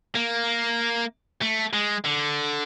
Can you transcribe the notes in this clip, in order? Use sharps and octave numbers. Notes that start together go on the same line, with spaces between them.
A#3
A3
G#3
D3